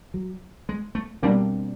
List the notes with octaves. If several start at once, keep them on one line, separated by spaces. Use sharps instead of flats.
F#3
G#3
A3
B2 G3 A#3 C4 D4